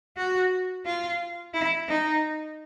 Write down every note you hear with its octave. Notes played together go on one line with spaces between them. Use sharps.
F#4
F4
E4
D#4